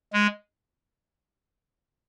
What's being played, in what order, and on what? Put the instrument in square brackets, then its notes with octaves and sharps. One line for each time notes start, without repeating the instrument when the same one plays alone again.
[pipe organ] G#3